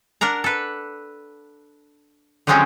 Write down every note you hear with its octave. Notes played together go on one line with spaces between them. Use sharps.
D4 A#4 F#5 A#5
A4 B4
D3 F3 F#3 G#3 C4 C#4